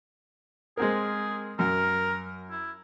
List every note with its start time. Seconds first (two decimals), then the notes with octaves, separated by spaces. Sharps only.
0.77 G#3 C4 G#4 A#4
1.59 F#2 A#4
2.51 E4